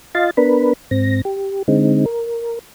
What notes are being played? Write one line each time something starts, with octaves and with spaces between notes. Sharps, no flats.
F4 D#5 F5 C6 A6
B3 D4 A#4 B4 B5
G#2 C4 A#6
G4
D3 G#3 C4 D#4
A#4